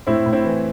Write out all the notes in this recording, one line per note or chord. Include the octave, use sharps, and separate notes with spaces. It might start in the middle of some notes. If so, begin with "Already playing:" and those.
A2 C4 E4
A2
C4 E4
E3